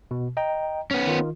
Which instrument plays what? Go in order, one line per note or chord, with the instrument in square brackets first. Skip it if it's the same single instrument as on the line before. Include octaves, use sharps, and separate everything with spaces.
[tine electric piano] B2
D#5 G5 A#5
[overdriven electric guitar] B3 C#4
[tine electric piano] D#3 F4